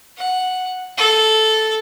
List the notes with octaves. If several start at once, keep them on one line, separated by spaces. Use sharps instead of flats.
F#5
A4